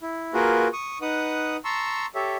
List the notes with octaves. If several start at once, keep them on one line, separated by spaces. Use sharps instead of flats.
E4
A#3 F4 F#4 G#4 A#4 B4
C#6 D#6
D#4 B4 F#5 D#6
A5 A#5 C6 C#6 E6
G4 A4 C#5 E5